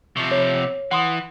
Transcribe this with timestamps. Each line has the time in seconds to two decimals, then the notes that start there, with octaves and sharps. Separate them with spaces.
0.17 C3 F3 C#6
0.31 C#5
0.91 E3 F#5 C6 D#6